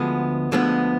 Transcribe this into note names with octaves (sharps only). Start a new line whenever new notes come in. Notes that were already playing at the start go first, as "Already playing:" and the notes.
Already playing: D2 D3 F3 G#3 B3
D2 D3 F3 G#3 B3